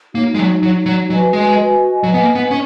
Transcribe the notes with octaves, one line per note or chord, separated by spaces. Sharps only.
A#3 D#4 F#4 C#5
G#3
F#3
F#3 D#4 F#4 C#5
F#3
F#3 F#4 B4 D#5 G#5
G#3
F#4 B4 D#5 G#5
F#3 B4 D#5 G#5
B3
A#3
B3
C#4